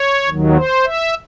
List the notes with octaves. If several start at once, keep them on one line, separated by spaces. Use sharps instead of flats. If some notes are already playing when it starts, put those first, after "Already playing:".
Already playing: C#5
D#2 D#3 F#3
C5
E5